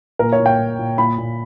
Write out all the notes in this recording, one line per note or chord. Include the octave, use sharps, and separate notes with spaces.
A#2 A#4
C#5
A#2
G5
A#2
A#2
A#2 B5
A#2